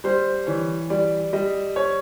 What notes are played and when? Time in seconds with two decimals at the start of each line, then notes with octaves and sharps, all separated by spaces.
0.04 G3 C5
0.47 E3 C#5
0.90 G3 D5
1.33 G3 D#5
1.76 C#5